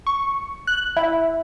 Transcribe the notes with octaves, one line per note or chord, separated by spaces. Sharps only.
C#6
F#6
E4